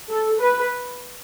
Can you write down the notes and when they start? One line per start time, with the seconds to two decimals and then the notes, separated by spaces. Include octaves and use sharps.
0.10 A4
0.40 B4